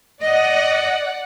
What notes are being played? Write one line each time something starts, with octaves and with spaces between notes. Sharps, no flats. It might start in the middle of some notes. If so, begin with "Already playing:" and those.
D5 D#5 F#5